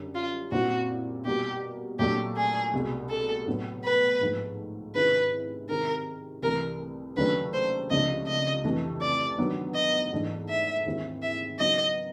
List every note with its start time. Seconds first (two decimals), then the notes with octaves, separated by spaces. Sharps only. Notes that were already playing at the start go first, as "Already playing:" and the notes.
Already playing: F#2 D3 G3
0.15 F4
0.52 A#2 G3 C4 E4 F#4
1.25 B2 G3 A#3 G4
1.99 A#2 F#3 A3 D4 G4
2.36 G#4
2.73 C2 B2 G#3
3.10 A4
3.47 A2 F#3 B3
3.84 B4
4.21 G#2 F3 A3
4.95 C3 D#3 G#3 C#4 E4 B4
5.69 C3 D#3 G#3 C4 A#4
6.42 C2 C3 E3 A3 A#4
7.17 D#2 C#3 F#3 A3 D4 B4
7.53 C5
7.90 C#2 C3 F3 A3 D4 D#5
8.27 D#5
8.64 F2 C3 E3 A3
9.01 D5
9.38 G2 D#3 F#3 B3
9.75 D#5
10.12 G#2 E3 A3 D4
10.49 E5
10.86 D#2 D#3 G#3 C4 E4
11.22 E5
11.59 C#3 F#3 B3 D#4 D#5